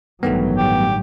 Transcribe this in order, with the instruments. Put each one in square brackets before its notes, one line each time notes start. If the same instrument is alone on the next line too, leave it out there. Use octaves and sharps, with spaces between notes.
[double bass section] A1 F#3 [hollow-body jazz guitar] G2 D#3 A3 [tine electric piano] B3
[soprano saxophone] G4